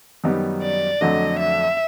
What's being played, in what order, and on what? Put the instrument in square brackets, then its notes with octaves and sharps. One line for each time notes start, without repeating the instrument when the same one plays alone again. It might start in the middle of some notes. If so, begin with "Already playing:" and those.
[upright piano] F#2 D#3 G3 B3 D#4
[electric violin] D5
[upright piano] F2 D3 F#3 A3 D4 [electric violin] D#5
[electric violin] E5